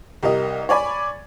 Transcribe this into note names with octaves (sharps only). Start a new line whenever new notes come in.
C2 G4 A#4 D#5
C#5 D5 G#5 B5